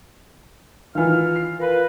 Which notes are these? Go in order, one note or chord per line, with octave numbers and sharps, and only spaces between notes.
D#3 E3 F4 F6
C7
F4 A#4 B4